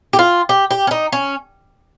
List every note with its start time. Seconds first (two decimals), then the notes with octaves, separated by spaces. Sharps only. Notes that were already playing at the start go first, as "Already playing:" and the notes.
0.13 G4
0.19 F4
0.49 G4
0.71 G4
0.87 C#4
0.91 D#4
1.12 C#4